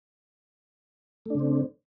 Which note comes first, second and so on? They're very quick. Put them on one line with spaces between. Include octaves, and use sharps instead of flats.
A3 D4 C#3 C4